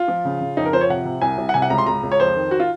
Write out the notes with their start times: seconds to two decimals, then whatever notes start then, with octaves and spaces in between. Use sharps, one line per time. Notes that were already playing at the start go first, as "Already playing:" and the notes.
Already playing: F4
0.08 F3
0.25 C#3
0.41 C#3
0.57 F2 D#4
0.65 A#4
0.73 F3 C5
0.81 C#5
0.90 C3 F#5
1.05 C3
1.22 C2 G#5
1.38 C2
1.49 F#5
1.54 C3 G#5
1.62 F#5
1.70 C#2 A#5
1.78 C6
1.86 C#2 A#5
2.03 C#2
2.12 C#5
2.20 F2 C5
2.36 D#3
2.51 F#4
2.60 F4